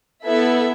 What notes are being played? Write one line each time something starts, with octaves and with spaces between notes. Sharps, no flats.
B3 E4 A4 E5